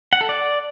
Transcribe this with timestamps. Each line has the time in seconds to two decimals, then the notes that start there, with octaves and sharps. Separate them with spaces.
0.13 F#5
0.21 A4
0.29 D5